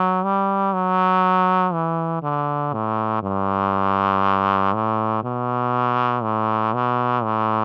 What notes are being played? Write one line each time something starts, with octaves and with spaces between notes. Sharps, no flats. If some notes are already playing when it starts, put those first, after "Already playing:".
Already playing: F#3
G3
F#3
E3
D3
A2
G2
A2
B2
A2
B2
A2